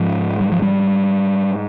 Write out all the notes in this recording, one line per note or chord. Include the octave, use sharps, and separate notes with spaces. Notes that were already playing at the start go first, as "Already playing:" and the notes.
Already playing: G#2 F3
G3
F3
G3